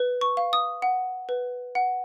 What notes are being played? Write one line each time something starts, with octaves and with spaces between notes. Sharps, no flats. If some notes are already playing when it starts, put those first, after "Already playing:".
Already playing: B4
C#6
F5
D#6
F#5
B4
F#5